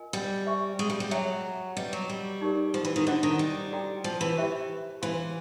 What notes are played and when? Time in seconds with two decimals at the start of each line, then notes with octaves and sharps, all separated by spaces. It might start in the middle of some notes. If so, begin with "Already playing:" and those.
Already playing: F4 A#4 D#5 G#5
0.13 G3
0.47 G4 C5 E5 G#5 C#6
0.79 G#3
0.90 G3
1.00 G3
1.11 F#3 G#4 C#5 E5 G5
1.76 G3 F#4 B4 D#5
1.93 F#3
2.09 G3
2.41 D#4 G4 A#4 D5
2.74 F3
2.85 E3
2.96 D#3
3.07 D3 E4 A4 C5 D#5 F#5
3.23 D#3
3.39 G3
3.72 F#4 A4 D5 G5 A#5
4.04 F3
4.21 E3
4.37 G4 C5 E5 G5 B5
5.02 E3 C5 F5 G#5 C6